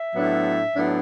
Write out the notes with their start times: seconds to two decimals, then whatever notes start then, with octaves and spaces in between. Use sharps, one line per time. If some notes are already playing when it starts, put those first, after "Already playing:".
Already playing: E5
0.14 A2 F#3 B3 D4
0.74 A2 F#3 B3 D4